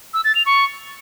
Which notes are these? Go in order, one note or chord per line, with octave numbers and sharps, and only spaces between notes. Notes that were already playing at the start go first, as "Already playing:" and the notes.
E6
A6
F7
C#6